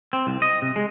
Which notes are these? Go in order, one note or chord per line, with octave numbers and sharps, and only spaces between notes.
C4
C2
D#5
C3
G#3